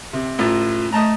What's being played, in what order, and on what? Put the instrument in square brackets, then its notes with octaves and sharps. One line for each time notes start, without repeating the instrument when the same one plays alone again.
[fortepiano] C3
[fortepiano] A1 A2 [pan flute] F4
[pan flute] A3 [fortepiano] D#5 A5 A#5